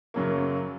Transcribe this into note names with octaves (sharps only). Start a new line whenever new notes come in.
F#2 C#3 F#3 A#3